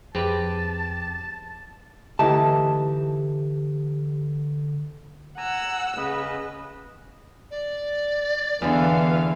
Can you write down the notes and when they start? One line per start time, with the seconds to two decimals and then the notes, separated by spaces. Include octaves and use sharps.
0.15 F2 C4 G4 G#4 B4 A5 D6
2.19 D3 E3 A3 D#4 G4 A5
5.37 F#5 G#5 A#5 E6
5.97 C#3 B4 D#5
7.50 D5
8.62 E2 D3 E3 B3 F5